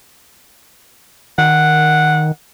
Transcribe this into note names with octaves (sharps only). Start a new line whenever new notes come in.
D#3 F#5